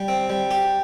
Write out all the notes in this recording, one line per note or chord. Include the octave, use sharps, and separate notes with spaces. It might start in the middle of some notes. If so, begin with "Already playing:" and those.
Already playing: G3
C4
G3
G4